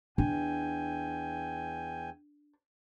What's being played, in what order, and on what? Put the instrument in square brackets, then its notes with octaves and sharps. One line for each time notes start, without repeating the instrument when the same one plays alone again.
[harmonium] E2 G5 G#5 [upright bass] D4